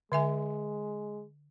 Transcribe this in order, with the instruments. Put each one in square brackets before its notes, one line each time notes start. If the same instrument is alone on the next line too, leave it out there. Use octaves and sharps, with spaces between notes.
[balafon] D3 E5 G#5 [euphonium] G#3